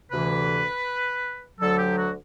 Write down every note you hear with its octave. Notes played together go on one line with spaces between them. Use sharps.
D2 C3 E3 B4
D2 D3 F#3 A4
G4
F#4